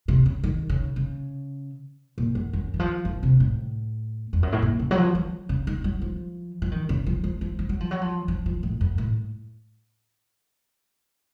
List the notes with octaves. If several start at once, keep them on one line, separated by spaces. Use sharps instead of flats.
C3
C#3
D#3
C#3
C#3
A#2
F#2
F#2
D#3
F3
D#3
C3
A2
F2
F#2
A2
A#2
C#3
F#3
F3
F#3
C#3
D#3
F#3
F3
F3
D#3
C#3
F3
F3
F3
F3
F#3
F3
F#3
F3
F3
F3
A2
F#2
A2